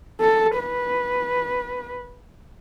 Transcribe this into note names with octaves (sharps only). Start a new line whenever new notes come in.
A4
B4